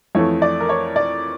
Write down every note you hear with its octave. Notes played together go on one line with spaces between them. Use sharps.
F2 E3 A3 C#5
D5
A#4
C#5
D5